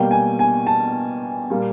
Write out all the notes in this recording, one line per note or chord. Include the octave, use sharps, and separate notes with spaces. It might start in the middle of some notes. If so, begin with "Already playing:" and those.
Already playing: B2 G3 A#3 G5
G#5
G#5
A5
A#2 G3 A#3